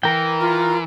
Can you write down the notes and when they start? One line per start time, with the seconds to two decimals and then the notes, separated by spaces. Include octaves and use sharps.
0.03 E3 A#4 G5
0.40 F4 A#5 F6